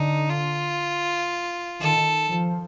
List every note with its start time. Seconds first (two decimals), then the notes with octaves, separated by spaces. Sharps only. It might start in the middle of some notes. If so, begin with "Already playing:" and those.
Already playing: D3 D#4
0.30 F4
1.80 D#3 A4
2.30 F3